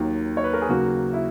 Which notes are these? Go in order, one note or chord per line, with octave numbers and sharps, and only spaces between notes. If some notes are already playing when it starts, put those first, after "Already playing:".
Already playing: D#2 D#3 F#3
C#5
B4
A#4
G#4
D#2 C#3 F#3 A#3 F#4
E4